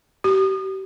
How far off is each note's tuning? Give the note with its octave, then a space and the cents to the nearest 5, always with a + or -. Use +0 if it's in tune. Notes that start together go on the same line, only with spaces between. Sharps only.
G4 -35